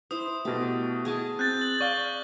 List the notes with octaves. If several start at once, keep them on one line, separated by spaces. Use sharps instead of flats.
E4 C5 D#6
B2 A3 G4
G#4 G#5 A5
C4 F#6 G6 A6
F#7
D5 F5 C#6 G7